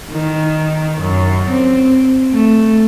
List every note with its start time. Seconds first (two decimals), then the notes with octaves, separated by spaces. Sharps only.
0.10 D#3
1.00 F#2
1.50 C4
2.33 A3